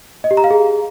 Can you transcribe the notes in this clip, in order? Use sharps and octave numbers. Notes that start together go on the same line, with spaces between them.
D#5
G4
A#5
F5
G#4